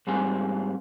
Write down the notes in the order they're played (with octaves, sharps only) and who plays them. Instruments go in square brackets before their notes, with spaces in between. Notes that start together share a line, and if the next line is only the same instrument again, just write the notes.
[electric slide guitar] G#2 G3 C4 G#5